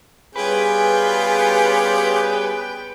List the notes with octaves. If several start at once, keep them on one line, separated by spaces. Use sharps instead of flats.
G3 B3 C#4 F4 G4 G#4 B4 G5